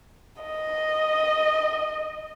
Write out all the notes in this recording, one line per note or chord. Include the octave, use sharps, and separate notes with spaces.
D#5